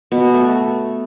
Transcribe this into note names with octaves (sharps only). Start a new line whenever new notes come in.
B2 B3
A3